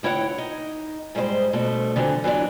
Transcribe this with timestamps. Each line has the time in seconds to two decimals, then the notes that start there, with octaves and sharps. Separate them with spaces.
0.03 D2 E4 C#5 F#5 G5
0.38 D#4
1.15 G#2 G3 G#3 B4 C5
1.53 G2 B2 A3 C5
1.96 D3 E3 F#3 C4
2.24 E3 F#3 B3 D4